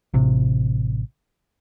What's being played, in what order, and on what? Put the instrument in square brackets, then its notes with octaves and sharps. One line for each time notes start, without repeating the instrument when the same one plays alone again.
[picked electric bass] A1 C3